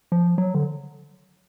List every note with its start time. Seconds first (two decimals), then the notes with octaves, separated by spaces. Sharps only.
0.12 F3
0.38 F#3
0.54 D3